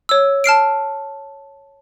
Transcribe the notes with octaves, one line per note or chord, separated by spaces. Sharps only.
C#5 E6
A5 F6 C7 D7